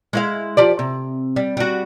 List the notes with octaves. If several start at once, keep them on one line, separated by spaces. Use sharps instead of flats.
G#3 E4 F5
F3 G4 D5
C3
G3
G3 F#4